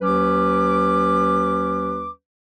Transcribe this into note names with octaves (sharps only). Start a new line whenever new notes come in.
D#2 F#3 C#4 B4 D6